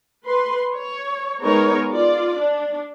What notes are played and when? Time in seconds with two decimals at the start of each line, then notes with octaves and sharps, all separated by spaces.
0.24 B4 C6
0.74 C#5
1.41 G#3 B3 D#4 A#4 C#5
1.90 F4 D5
2.36 D4